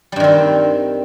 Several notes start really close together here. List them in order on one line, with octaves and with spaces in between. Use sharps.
G3 G2 D#3 C4